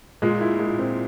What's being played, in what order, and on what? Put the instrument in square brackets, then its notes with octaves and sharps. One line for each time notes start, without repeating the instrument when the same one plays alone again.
[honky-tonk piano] A#2 [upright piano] G#3
[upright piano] E4
G#3
C4